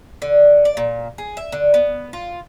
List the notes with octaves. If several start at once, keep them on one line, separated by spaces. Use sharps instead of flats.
D3
D5
A#2
G#4
E5
D3
B3
F4